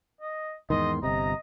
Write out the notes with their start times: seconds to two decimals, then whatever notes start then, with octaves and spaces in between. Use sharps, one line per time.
0.21 D#5
0.70 E2 G#2 D#3 D#5 C6
1.03 G1 C3 D#5 A#5